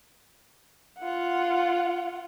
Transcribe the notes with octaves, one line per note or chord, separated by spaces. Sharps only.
F4 F#5